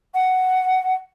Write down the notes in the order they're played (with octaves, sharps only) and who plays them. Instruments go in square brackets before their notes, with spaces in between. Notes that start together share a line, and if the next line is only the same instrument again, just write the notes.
[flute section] F#5